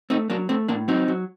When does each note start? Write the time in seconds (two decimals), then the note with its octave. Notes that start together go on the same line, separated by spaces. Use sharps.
0.10 A3 C4 D#4
0.30 F#3 A#3 D4
0.49 A3 C4
0.68 A2 A#3 D4
0.88 F#3 C4 D#4
1.08 F#3